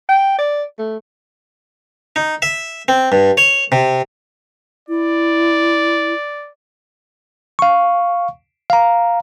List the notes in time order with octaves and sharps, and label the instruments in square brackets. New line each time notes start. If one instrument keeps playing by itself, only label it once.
[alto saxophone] G5
D5
A3
[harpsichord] D#4
E5
C4
G2
C#5
C3
[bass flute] E4 [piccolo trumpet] D5
[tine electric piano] F5 C#6
F5 A#5